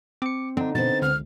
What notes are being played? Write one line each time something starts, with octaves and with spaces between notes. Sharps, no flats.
C4 D6 C#7
D3 C4 D4 D#4
B2 B3 C4 A6
C#2 D3 F6